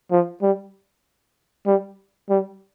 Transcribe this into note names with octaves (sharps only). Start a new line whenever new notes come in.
F3
G3
G3
G3